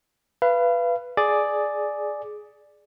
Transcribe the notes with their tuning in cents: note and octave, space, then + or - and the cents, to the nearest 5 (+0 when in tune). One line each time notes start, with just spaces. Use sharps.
B4 +0 F5 -35
G#4 +10 D5 +5